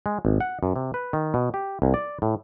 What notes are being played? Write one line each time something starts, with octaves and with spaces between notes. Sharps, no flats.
G#3
G#1
F#5
F#2
C3
B4
D#3
B2
G4
C2
D5
A2